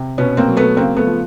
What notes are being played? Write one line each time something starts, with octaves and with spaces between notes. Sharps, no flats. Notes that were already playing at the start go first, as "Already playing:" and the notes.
Already playing: C3
B2 B3 C#4
A#3 C4
F#3
A3 B3
C#3 A#3 C4
A3 B3
F3